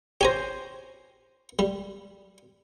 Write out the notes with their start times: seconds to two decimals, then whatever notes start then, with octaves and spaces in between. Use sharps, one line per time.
0.21 G4 C5 C#5 G#5 A#5
1.59 G3